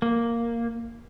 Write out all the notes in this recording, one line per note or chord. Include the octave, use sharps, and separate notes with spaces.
A#3